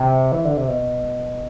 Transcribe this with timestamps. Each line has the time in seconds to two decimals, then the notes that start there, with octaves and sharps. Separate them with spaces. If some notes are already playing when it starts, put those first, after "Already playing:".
Already playing: C3
0.32 E3
0.45 D3
0.57 C3
0.68 B2